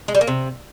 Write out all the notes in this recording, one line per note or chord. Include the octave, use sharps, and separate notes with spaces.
G#3
G3
A#3
C3